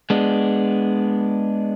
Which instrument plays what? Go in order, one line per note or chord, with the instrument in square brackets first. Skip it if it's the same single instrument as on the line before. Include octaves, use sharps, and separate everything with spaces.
[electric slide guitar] G#3 B3 D4